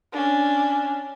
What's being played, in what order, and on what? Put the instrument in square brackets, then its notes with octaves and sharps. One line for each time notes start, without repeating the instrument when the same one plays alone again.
[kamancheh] C#4 D4